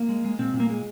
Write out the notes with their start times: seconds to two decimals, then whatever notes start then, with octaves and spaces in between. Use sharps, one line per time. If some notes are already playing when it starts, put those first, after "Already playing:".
Already playing: A#3
0.09 G#3
0.24 G#3
0.39 A#2 C4
0.54 A#2
0.60 A#3
0.70 G#3